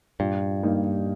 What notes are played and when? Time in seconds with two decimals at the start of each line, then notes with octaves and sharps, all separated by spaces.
0.19 G2 A#2
0.63 G3 A#3 D#4